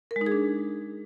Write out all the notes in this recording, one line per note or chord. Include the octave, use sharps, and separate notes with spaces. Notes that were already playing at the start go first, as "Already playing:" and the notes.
A#4
G#3
D#4
G#4
D4